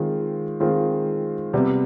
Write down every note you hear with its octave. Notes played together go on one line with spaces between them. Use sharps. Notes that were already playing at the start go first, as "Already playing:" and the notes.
Already playing: D#3 G#3 C4 F4
D#3 G#3 C4 F4
C3 G3 B3